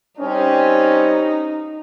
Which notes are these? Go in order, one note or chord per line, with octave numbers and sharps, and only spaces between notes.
G3 C4 C#4 D#4